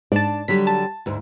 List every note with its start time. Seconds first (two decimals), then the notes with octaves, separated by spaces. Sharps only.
0.12 G#2 D4 D5 A5
0.48 D3 F#3 G3 B6
0.67 A5
1.06 D2 G#2